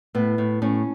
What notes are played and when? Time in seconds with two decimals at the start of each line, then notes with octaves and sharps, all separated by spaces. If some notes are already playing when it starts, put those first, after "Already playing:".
0.15 A2 B3
0.38 A2
0.62 A2 C#4